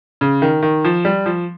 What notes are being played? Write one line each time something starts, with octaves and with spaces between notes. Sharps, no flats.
C#3
D#3
D#3
F3
G3
F3